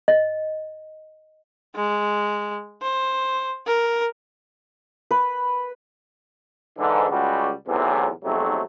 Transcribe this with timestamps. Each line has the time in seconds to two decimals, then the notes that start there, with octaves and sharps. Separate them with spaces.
0.08 D#5
1.76 G#3
2.82 C5
3.66 A#4
5.11 B4
6.78 G#2 D3 E3
7.10 C#2 G3 F#4
7.68 B1 E2 A2 C3 E3 F#3
8.24 B1 F2 G#2 C3 F#3 A3